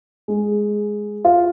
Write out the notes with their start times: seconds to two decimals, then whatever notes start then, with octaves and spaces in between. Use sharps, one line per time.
0.28 G#3
1.25 F4